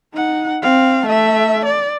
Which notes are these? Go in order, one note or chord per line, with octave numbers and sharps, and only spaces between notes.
D#4 F#5
C4 F5
A3 E5
D5